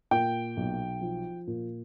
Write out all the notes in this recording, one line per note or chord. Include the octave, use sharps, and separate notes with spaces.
A#2 G5
B1
F3
A#2